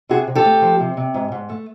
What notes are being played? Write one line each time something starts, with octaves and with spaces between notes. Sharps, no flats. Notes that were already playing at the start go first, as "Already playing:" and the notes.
C3 F#4 G#4
C3
G4 A4
A3
F3
C3
C3
G#2
G#2
A3